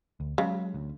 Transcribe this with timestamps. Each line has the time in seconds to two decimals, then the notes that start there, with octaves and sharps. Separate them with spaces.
0.20 D2
0.38 C#3 F#3 G#3
0.75 D2